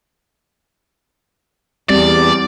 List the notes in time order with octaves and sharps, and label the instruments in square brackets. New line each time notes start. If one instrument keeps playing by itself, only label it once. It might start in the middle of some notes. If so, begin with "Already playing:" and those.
[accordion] E2 [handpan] G3 C4 G4 [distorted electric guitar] D5